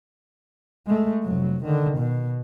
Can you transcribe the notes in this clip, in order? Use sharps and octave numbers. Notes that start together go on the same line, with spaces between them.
G#3 A3
F1 F#3
D3 D#3
B2